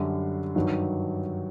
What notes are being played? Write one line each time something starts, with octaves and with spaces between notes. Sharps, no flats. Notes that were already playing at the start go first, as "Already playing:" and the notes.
Already playing: F#2 D3 G3
G2 D#3 F#3